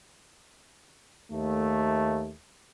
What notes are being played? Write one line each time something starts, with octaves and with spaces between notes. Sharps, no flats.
D#2 A3